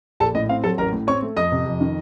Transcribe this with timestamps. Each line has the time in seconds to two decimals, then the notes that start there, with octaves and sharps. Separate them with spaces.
0.20 A#1 A4 A5
0.35 A2 D#5
0.49 C4 F5
0.64 F#3 A4 A5
0.78 A1 A#4 A#5
0.93 A2
1.07 C4 C#5 C#6
1.22 A3
1.37 F2 D#5 D#6
1.52 C3
1.66 F2
1.81 D#3